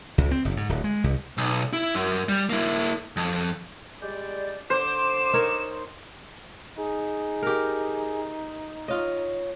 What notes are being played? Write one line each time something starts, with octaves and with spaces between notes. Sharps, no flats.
C#2
C4
F#1
G#2
D1
G#3
C2
B1
E4
F#2
G3
A#3 E4
F2
G3 G#3 D5 G6
D3 C5 D6 E7
D#4 A#4 C#5
D#4 G#4
G4 A#4
F4 C#5 D#5